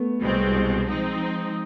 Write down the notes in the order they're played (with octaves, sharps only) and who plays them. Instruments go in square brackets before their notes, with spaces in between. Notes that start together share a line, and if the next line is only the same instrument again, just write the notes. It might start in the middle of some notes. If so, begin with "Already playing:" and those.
Already playing: [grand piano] A3 B3
[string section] C2 B2 G#3 C4
F3 G#3 C4 D#4